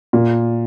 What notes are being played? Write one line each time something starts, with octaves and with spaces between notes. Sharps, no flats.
A#2